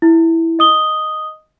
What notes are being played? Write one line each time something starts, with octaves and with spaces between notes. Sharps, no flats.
E4
D#5 D#6 G7